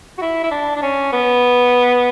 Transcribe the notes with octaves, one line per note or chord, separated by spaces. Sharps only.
F#4
E4
E4
D4
D4
C#4
B3